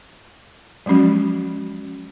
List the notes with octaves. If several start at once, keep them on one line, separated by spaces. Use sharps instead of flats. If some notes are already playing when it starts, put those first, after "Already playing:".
F3 F#3 G#3 C#4 F#4